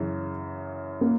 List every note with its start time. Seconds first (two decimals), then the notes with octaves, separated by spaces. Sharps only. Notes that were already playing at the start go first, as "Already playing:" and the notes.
Already playing: F#2 C#3 E3
1.01 A#3